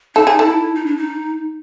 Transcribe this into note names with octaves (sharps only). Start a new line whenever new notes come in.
D#4 A4
G#4
A4
E4
D#4
D4
D#4